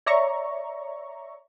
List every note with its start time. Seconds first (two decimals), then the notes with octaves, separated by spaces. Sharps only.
0.06 C#5 D5 E5 A#5 C#6